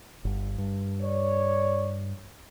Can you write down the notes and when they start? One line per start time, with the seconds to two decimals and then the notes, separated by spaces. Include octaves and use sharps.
0.25 G1
0.58 G2
1.02 C#5 D5